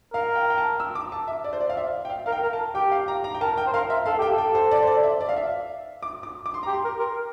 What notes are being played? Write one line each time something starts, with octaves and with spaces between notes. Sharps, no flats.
A#4 F5
G5
G5
A5
E6
D6
A5
E5
D5
C5
D5
F5
E5
G5
F5
A#4 F5
G5
A#4
A5
G4 G5
F5
A#5
A#5
G5
A#4 A5
G5
C5
A#4 F5
E5
A4 F5
G4 G5
A4
G5
C5
D5
C5
D5
E5
D5
F5
E5
D6
D6
D6
C6
G4 A#5
C6
A#4
A#4